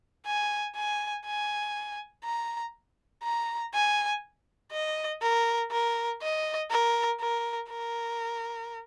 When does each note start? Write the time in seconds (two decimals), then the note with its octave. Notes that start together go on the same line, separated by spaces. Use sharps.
0.26 G#5
0.76 G#5
1.26 G#5
2.25 A#5
3.24 A#5
3.74 G#5
4.72 D#5
5.22 A#4
5.72 A#4
6.22 D#5
6.71 A#4
7.21 A#4
7.70 A#4